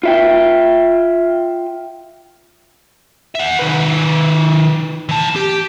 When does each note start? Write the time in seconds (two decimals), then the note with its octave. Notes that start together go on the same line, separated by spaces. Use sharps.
0.03 F4 E5 G5
3.35 E5 F#5
3.59 D#3 B4
5.09 E3 A5
5.36 G4